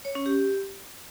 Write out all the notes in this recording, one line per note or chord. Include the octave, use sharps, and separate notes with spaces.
C#5
C#4
G4